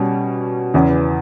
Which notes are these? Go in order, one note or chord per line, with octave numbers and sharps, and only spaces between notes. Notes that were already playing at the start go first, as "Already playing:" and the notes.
Already playing: B2 G3 C#4
E2 C#3 E3